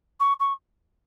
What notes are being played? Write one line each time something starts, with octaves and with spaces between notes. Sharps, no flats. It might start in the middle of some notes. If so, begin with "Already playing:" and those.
C#6
C#6